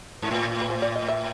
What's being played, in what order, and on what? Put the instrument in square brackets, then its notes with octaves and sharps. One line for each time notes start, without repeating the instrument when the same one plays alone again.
[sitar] G#2
A2
[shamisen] B4
C5
D5
D#5
E5